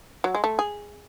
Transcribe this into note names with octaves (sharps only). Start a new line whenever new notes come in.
F#3
G#3
A3
G#4